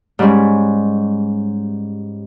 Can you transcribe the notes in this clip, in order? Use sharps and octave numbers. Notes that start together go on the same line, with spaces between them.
G#2 G3 C#4 G#4